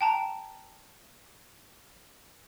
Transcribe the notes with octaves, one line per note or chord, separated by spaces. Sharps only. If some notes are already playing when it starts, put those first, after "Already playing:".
G5 A5 A#5